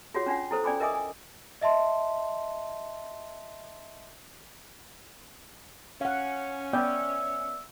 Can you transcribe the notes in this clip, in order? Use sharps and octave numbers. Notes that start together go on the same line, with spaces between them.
F4 F#4 G#4 C#5 F#5
C#4 D4 F4 F#5
E4 A4 C5
C#4 D5 G5 G#5 B5 D6
A#4 D#5 E5 G#5 D6 D#6
G#5
D#5 E5 A5 C6
C#4 F5 F#5
B3 D5 E5 G5